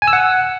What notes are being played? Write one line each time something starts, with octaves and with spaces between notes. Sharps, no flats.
G#5
E6
F#5